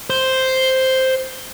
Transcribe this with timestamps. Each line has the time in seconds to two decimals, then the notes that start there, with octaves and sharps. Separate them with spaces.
0.10 C5